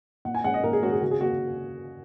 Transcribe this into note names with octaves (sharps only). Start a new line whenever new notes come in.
A#2 F#5
G#5
G#3 C#4 F#5
D#5
A#2 A#4
G#4
G#3 C#4 F#4
G#4
C#3 F#4
G#4
A#3 F#4